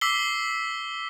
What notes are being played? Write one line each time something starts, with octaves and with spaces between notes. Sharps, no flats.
D6 E6 B6 C7 G7